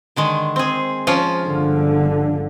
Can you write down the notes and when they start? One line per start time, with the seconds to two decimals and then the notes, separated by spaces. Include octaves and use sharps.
0.16 D3 D#3 G#3
0.56 C4 G#4
1.07 F3 C#4 F4
1.45 G1 D3